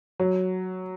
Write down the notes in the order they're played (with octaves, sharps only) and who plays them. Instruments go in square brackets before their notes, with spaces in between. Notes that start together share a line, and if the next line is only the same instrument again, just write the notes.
[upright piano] F#3